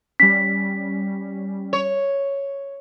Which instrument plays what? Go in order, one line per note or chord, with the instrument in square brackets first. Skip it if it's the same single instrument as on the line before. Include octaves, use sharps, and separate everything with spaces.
[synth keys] G3 C#4 [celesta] B6
[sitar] C#5